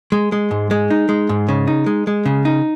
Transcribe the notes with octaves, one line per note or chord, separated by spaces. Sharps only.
G#3
G#3
G#2
G#3
D#4
G#3
G#2
C#3
D#4
G#3
G#3
C#3
D#4